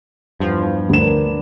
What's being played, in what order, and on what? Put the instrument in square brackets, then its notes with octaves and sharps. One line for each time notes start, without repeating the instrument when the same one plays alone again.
[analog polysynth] E2 F3 [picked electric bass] G2
[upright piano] D2 E7 [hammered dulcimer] B3 D4 A#4